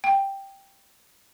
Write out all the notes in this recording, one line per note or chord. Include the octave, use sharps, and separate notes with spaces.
G5